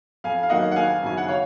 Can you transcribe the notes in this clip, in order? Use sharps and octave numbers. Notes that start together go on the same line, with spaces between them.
F2 F5 G#5
F5
D#3 F#3 A#3 D#5 F#5
F#5
G#1 F5 G#5
F#2 C#3 F#3 G#5
F#5
C#5 F5